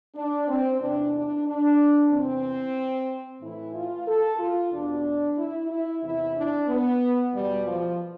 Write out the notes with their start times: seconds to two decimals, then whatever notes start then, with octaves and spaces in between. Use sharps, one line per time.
0.15 D4
0.47 C4
0.80 E2 C3 E3 D4
1.13 D4
1.46 D4
2.10 E2 C3 E3 C4
3.41 A2 E3 E4
3.74 F4
4.07 A4
4.39 F4
4.72 E2 B2 D4
5.37 E4
5.70 E4
6.03 E2 C3 E3 E4
6.35 D4
6.68 B3
7.33 E2 B2 G3
7.66 F3